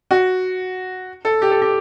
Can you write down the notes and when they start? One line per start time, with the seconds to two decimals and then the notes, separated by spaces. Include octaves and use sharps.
0.11 F#4
1.25 A4
1.42 G4
1.51 A4
1.62 G4